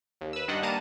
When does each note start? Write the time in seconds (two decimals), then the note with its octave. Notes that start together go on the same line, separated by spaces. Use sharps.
0.21 D#2
0.33 B4 E6
0.48 G2 D#3 D4 D#5 F#5
0.62 G3 A#3 A5 A#5 D#7